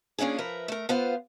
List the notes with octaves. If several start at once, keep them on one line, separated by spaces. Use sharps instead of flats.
A#3 C#4 D4 F4 G#4
F3 A#4 B4 E5
A3 A#4
B3 F4 B4 C5 F5